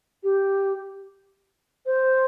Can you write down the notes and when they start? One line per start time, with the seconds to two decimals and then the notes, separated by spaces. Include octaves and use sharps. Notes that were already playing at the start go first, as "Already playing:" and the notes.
0.24 G4
1.86 C5